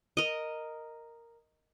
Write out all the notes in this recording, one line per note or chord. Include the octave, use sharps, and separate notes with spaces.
A#4 D#5